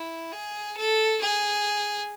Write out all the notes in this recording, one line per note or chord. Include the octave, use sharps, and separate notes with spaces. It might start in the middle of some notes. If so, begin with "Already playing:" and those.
Already playing: E4
G#4
A4
G#4